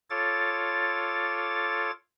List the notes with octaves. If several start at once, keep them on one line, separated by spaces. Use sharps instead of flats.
F4 A4 C#5 D6 A6